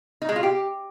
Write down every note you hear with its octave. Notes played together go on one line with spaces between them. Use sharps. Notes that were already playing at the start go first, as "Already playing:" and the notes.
D#4
G#3
F4
G4